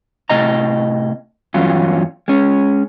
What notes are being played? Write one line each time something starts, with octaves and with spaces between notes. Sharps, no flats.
A2 C3 D#5 A#5
E2 G2 F#3 C#4 F4
G#3 C#4